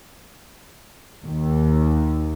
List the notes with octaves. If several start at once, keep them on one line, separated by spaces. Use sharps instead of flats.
D#2